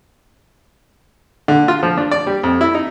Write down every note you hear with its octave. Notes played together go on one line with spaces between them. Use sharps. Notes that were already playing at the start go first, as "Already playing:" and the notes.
D3
F4
F3
D4
D5
G3
F2
E4
D#4